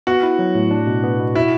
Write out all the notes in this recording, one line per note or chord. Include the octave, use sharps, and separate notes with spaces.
B3 F#4
E4
F#3
A2
D4
B2
B3
B2
E4 F#4